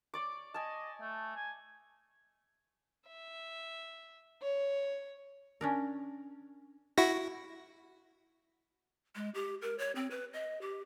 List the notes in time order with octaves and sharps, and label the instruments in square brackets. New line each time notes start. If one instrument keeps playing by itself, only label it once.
[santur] C#5 D5 D6
[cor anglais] D#5 [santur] G#5 A5
[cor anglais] A3
G#5
[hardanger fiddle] E5
C#5
[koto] C#4 D4 A#4
[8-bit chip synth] E4 F#4 A#6
[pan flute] G#3
G4
A#4
C#5
C4
B4
D#5
G4